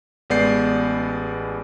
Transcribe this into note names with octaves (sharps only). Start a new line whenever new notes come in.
A1 G#3 B3 D5 G6 C7